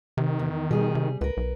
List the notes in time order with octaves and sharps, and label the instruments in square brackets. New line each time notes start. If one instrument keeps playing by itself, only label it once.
[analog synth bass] C3 [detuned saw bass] D#3
[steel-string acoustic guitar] E2
[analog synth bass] B2 [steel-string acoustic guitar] G3 G#4
[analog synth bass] C3
[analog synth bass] C#2 [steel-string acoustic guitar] A#4 B4
[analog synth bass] B1